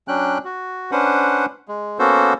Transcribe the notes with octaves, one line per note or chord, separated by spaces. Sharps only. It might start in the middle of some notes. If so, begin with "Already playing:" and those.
F#3 C#4 D4 G5 F#6
F#4
C#4 D4 B4 C5 F#5
G#3
A#3 B3 C#4 F#4 A4 C5